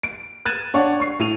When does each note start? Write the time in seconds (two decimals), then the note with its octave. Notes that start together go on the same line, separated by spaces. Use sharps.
0.03 D7
0.45 F#6 G#6 A6 D#7 E7
0.74 D4 C#5 D5 F#5
1.00 C#6 C7
1.19 A2 D#7 F7